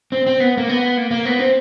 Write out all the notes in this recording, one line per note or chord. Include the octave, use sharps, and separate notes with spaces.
C4
C4
B3
A#3
B3
A#3
A#3
B3
C4